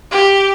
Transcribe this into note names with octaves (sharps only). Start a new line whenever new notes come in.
G4